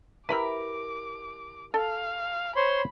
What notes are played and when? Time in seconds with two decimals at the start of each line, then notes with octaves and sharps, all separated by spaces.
0.29 E4 G4 A#4 B4 B5 D6
1.74 A4 F5
2.56 C5 C#5 B5 C6